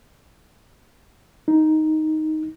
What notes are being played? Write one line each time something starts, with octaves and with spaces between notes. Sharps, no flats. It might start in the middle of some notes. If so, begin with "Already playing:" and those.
D#4